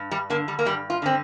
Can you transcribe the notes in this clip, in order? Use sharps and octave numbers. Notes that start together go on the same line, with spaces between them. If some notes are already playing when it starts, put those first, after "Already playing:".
Already playing: G2
G3
D3 A#3
G3
A#3
G2 G3
F4
D3 C4